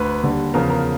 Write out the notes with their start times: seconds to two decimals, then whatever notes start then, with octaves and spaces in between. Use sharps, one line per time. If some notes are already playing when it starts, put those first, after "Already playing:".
Already playing: D2 B4
0.24 D#2 D3 G3
0.54 E2 C#3 F3 A#4
0.70 A#4